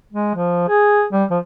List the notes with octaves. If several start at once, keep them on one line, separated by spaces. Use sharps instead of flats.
G#3
F3
G#4
G3
F3